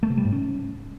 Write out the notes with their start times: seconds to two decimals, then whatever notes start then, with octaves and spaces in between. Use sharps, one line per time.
0.03 A3
0.10 C3
0.18 G3
0.25 G#2
0.32 C#4